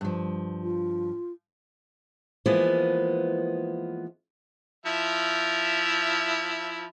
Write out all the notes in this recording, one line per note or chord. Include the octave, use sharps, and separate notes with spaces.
G2 F3
F4
E3 F3 G#3 A#3 B3
F3 E4 E5